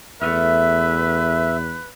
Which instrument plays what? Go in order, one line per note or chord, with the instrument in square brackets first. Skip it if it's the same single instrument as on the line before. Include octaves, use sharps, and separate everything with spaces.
[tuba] E2 [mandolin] A3 B3 F6 [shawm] B4 [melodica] E5